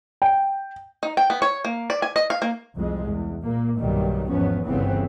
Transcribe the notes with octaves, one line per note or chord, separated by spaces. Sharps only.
G5
D#4
G5
B3
C#5
A#3
D5
G#5
D#5
F5
A#3
C2 F2 G#3
E2
A#2 A#3
B1 G2 A#2 D#3 G3
G#1 E2 F3 B3 C#4
G1 C2 C#3 E3 B3 C4